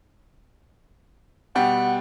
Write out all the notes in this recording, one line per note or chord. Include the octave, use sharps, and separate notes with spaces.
B2 G3 F#5 G5